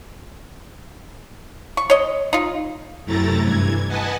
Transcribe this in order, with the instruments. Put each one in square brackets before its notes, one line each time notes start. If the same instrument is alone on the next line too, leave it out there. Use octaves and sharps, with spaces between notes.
[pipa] C#6
C#5 D#5
D#4 F4
[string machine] F#2 C3 A3 E4 A#5 A6
G2 E3 G#6
B4 D#5 F#5 G#5 A5